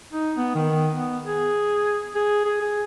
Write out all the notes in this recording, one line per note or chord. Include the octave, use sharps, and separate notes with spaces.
D#4
B3
D#3
B3
G#4
G#4
G#4
G#4